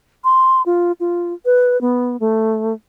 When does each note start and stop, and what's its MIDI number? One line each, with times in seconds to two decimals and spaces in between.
0.24 0.62 84
0.66 0.92 65
1.00 1.33 65
1.45 1.79 71
1.81 2.16 59
2.20 2.73 57